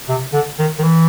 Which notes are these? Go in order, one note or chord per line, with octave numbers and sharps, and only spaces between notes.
C3
D3
D#3
D#3
E3